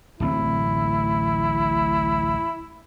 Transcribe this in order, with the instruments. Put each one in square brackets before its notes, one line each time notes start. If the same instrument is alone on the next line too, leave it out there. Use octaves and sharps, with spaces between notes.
[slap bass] D1 A1 C4 [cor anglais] E4